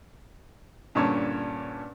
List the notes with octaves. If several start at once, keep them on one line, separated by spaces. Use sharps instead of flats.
G2 A#2 D3 C#4 C#5 A5